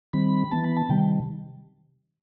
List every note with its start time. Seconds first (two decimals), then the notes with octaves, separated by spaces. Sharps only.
0.13 D#3 G3 C4 B5
0.51 E3 B3 A5
0.64 B5
0.77 A5
0.89 C3 D#3 G3 G5